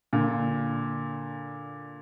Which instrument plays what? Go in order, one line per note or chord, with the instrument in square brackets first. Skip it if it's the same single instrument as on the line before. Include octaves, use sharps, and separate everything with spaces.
[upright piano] A#2 D3